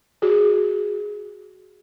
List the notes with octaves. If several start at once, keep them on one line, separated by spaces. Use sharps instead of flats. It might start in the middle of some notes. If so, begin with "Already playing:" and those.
F#4 G#4